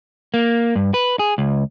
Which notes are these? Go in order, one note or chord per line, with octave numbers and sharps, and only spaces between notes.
A#3
G2
B4
G#4
C#2